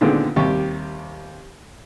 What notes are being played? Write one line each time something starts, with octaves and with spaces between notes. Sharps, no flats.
A#2 D3 D#3 G#3 B3 C4
D#2 C3 G3 G4 C#6